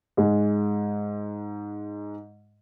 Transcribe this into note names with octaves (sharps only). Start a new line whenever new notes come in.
G#2 G#3